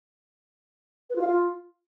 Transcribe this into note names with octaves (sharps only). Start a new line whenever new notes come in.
B4
F4
F5
F4